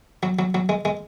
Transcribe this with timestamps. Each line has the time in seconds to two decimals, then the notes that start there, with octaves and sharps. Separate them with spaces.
0.23 F#3
0.39 F#3
0.55 F#3
0.69 G#3
0.85 G#3